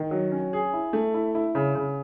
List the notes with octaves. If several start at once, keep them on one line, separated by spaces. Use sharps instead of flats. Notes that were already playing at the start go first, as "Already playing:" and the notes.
Already playing: D#3
F#3
C#4
G#4
E4
A3
E4
E4
C#3
C#3